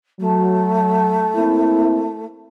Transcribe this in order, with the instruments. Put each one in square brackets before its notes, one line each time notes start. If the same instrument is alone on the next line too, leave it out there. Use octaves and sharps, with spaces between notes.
[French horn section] F#3 [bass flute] A3
[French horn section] A#3 C4 E4